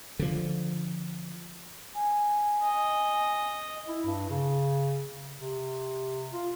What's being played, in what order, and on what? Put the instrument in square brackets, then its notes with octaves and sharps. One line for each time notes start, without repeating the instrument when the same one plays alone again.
[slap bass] D3 F3
[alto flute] G#5
[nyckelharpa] D#5
[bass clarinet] E4
G2
C#3
C3
F4